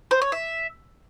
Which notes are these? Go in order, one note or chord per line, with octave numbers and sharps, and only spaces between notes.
C5
C#5
E5